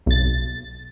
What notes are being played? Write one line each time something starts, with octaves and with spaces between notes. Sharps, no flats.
B1 A6